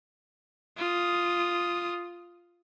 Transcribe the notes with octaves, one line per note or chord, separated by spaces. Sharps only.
F4 D#6